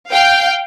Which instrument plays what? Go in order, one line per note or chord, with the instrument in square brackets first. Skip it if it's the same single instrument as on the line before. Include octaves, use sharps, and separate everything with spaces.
[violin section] F5 G5